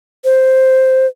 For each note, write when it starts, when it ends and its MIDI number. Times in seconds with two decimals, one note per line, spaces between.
0.24 1.06 72